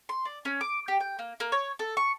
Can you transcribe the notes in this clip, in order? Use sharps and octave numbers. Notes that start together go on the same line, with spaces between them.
C6
D5
C#4
D6
G4
G5
A#3
A#3
C#5
A4
C#6